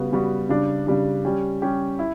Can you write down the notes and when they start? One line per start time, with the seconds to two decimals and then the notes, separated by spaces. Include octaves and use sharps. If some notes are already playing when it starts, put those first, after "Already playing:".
Already playing: C#3 G3 B3 F#4
0.12 C#3 G3 B3 F#4
0.49 C#3 G3 D4
0.86 C#3 G3 D4
1.25 G3 C#4 G4
1.62 G3 C#4 G4
1.99 E4